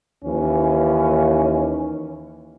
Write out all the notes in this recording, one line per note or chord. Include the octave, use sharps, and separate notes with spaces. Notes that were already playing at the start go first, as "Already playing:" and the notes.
D#2 E3 C#4